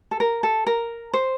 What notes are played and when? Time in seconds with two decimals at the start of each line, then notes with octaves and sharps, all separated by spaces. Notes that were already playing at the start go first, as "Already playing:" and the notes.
0.11 A4
0.20 A#4
0.43 A4
0.67 A#4
1.13 C5